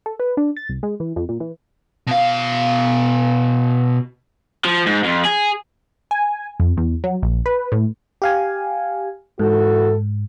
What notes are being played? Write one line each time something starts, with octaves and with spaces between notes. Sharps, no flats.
A4
B4
D4
A6
C2
G#3
E3
F2
A#2
E3
B2 F5
F3
G#2
F2
G#4
G#5
F2
E2
F#3
A#1
B4
A2
G4 F5 G#5
G#2 E3 F#4 A4